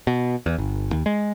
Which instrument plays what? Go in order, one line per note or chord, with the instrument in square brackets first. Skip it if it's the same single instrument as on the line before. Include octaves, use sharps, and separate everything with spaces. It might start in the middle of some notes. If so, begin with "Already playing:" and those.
[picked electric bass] B2
E2
G1
D#2
G#3